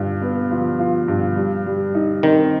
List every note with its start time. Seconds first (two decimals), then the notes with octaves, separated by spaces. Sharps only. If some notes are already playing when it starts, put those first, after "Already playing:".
Already playing: G2 F4
0.22 B3
0.51 F3
0.79 F4
1.08 G2
1.36 G3
1.66 G3
1.95 D#4
2.23 D#3 C4